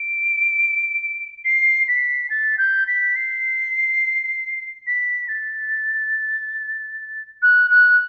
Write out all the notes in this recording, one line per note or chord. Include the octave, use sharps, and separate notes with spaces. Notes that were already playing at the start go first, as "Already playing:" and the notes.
Already playing: D7
C7
B6
A6
G6
B6
C7
B6
A6
F#6
F#6